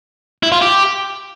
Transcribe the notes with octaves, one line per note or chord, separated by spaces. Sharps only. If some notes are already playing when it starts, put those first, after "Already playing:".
E4
F4
G4